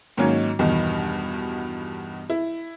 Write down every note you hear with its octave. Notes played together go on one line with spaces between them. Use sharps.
G#2 D#3 F#3 A#3 C#4
E2 G2 B2 D#3
E4